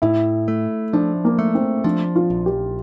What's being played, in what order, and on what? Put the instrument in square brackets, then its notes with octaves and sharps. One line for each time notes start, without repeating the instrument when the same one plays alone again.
[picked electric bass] A2 [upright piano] E4
[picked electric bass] A3
[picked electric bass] F3 [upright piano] D4
[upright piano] A#3
[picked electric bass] A3
[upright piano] C4
[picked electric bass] F3 [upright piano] D4
[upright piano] F4
[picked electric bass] A#1
[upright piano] G4